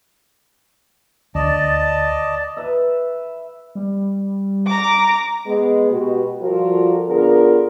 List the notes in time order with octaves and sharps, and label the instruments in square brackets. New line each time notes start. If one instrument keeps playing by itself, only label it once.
[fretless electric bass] D2 [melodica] D5 D#5 A5
[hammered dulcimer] B4 E5
[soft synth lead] G3
[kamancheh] A#5 D6
[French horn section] G#3 B3
B2 F#4 G4
F3 G3 F4 F#4 A4 A#4
D3 B3 F4 G#4 A#4